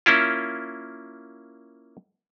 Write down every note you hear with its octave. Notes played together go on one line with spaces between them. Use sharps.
A#3 C#4 E4 F4